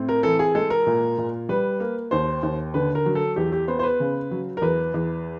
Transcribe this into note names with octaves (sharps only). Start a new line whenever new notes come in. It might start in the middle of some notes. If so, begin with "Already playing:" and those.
Already playing: A2 C4
A#4
E3 A4
G#4
G#3 A4
A#4
A#2
A#2
G3 B4
A#3
D#2 C5
D#2
D3 B4
A#4
F#3
A4
E2 G4
G4
B3 C5
C5
B4
C#3
F#3
A#4
E2 B4
E2